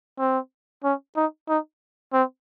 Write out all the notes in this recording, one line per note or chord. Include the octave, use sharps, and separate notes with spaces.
C4
C#4
D#4
D#4
C4